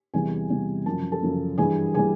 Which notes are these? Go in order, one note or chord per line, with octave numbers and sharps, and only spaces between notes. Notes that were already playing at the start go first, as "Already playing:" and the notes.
E2 C3 E3 G3 G#4 G#5
E2 C3 E3 G3
F#2 C#3 F3 A5
A4 A5
F#2 C#3 F3
G2 E3 G3 G#4 G#5
E3 G3 G#4 G#5